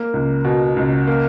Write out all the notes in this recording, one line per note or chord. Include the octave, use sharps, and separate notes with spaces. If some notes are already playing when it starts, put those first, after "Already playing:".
Already playing: A#3
C#2
B2
C#2
A#3